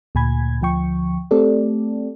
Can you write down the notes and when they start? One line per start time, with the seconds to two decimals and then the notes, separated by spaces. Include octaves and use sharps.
0.15 D2 A#2 G#5 B5 G#6
0.61 D2 F3 G5 C#6
1.31 A3 C4 G4 A4 D5